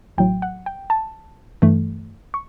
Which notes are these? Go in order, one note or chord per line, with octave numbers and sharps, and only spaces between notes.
A1 A2 F#3 G5
F#5
G5
A5
G2 E3 A3
C#6